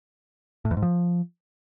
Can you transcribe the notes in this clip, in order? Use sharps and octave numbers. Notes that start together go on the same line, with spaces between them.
A2
E2
G#2
F3